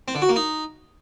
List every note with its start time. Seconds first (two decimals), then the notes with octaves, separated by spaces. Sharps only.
0.08 C4
0.15 D3
0.22 F#4
0.29 A#3
0.36 D#4